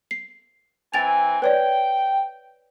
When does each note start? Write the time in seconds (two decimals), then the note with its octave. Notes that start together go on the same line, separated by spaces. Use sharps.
0.11 C7
0.94 E3 C4 G5 G#5 A6 F7
1.42 B4 C#5 D5 G5